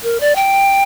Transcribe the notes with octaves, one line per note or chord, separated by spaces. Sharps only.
A#4
D5
G5